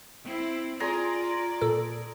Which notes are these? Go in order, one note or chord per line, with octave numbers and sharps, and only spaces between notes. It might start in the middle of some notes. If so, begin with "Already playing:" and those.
C4 E4
F4 G#4 D5 A#5 C6
A#2 A4